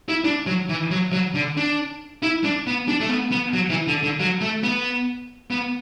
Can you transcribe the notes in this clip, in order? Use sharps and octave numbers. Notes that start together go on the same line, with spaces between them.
E4
D4
F#3
E3
F#3
F#3
D3
D4
E4
D4
B3
D4
A3
B3
B3
F#3
E3
D3
D3
F#3
A3
B3
B3